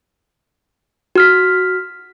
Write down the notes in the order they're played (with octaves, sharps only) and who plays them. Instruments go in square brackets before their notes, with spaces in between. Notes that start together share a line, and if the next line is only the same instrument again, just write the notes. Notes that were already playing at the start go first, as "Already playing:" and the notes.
[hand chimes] F#4 F6 B6